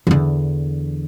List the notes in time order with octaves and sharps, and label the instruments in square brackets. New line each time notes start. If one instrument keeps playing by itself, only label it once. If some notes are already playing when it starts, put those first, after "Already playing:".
[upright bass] E2 D3